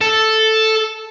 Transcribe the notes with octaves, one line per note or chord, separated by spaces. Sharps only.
A4